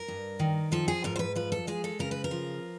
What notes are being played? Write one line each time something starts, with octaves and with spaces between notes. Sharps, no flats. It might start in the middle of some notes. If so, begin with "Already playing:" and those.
Already playing: A#4
G2
D#3
F3 A4
G#4
G#2 A#4
C5
B4
F3 B4
A4
G#3 G#4
A4
C#3 A#4
B4
A#4
F3